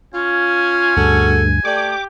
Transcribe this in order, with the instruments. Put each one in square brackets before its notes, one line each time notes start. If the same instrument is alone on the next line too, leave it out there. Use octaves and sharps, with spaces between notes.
[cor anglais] C#4 [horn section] F4 [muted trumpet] G#5
[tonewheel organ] D2 G2 [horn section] F#4 G#4 A4
[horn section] A3 A4 D5 [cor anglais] G4 [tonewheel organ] D6